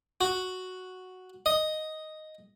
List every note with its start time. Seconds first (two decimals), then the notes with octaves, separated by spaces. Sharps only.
0.21 F#4
1.46 D#5